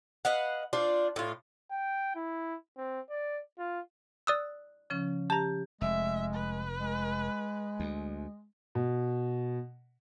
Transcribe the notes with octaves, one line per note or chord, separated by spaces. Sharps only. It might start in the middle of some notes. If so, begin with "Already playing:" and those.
B4 D#5 F5 F#5
D4 F4 C5 D5
A2 F4
G5
E4
C4
D5
F4
D5 D#6 E6 F#6
C#3 F3 C#4
G4 A5 A#5
F1 G#3 E5
B4
G#3
D2
B2